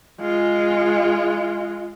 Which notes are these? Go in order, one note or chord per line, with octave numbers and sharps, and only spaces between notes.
G#3 F4